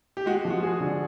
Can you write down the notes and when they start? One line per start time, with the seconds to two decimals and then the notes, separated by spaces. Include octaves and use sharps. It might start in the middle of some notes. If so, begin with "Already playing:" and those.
0.17 G4
0.26 G#3 F#4
0.45 F3
0.50 F#4
0.62 G#3 G#4
0.80 D3